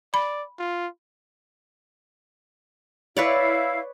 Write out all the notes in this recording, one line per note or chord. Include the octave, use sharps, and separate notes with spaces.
D5 B5
F4
E4 B4 C#5 D5 F5